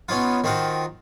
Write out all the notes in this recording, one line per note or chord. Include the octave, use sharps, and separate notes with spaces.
B3 C#4 D#4 F4
D#3 C4 D#4 F4 F#4